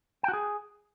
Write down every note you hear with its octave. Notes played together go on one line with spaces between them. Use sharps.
G5
F#4
G#4